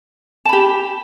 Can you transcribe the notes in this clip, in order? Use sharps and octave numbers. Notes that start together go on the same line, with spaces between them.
G4 A5 B5